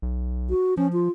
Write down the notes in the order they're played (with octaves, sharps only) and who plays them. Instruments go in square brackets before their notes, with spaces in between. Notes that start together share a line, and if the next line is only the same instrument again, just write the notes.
[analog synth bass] B1
[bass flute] F#4
[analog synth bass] F3 [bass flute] C#4
[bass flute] F4